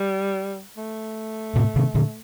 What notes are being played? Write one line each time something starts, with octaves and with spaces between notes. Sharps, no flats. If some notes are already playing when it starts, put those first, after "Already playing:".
Already playing: G3
A3
A2 C3
C3 D#3
A#2 D3